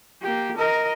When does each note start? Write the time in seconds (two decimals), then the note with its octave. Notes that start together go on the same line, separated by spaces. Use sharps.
0.22 A#3 G4
0.57 A#4 D#5